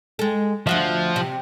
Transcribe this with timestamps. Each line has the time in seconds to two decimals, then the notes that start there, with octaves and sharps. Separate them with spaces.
0.19 G#3 A4
0.67 D2 F3 F#4 E5
1.16 C3